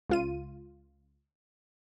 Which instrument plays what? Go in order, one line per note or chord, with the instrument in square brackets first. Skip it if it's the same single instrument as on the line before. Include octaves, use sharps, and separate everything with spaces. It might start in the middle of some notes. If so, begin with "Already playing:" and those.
[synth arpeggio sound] C#2 F4 D#7